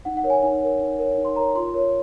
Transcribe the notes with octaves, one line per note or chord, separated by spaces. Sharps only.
D#4 F#5
F#5
A#4 C#5
G#5
D#4 G#5
A#4 C#5
D#4
A#4 C#5
D#4
C6
A#4 C#5 A#5
F4 C6
A#4 C#5